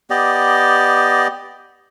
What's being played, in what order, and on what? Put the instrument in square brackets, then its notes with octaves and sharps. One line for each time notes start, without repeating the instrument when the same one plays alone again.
[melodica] B3 G4 D5 D#5